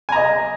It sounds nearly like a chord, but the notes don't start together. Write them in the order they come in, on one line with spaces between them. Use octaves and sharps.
G#5 A#5 D#5